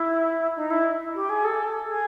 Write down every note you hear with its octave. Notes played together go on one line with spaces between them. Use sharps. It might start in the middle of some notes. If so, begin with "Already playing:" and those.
Already playing: E4
D#4
E4
G4
G#4
A4
G#4